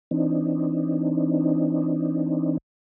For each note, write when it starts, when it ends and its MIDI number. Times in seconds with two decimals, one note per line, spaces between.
0.11 2.58 52
0.11 2.58 60
0.11 2.58 62
0.11 2.58 63